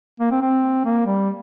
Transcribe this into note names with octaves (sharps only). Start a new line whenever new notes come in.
A#3
C4
C4
A#3
G3